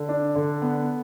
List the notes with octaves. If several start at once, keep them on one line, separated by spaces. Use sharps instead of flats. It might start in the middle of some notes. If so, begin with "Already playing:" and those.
Already playing: D3
D4
D3
B3